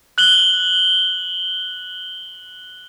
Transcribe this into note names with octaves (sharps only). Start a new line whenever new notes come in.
F#6 F#7 G7